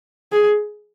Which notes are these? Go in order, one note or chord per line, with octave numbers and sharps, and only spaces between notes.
G#4